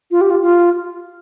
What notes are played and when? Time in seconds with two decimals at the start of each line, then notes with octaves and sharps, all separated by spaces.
0.11 F4
0.21 G4
0.30 F4
0.42 F4